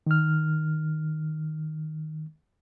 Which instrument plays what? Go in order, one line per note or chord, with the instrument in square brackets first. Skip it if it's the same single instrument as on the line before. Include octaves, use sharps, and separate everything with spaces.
[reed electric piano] D#3 F6